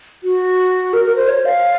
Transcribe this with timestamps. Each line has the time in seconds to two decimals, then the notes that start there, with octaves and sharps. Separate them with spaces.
0.24 F#4
0.93 A#4
1.05 A#4
1.16 C5
1.28 C#5
1.45 F5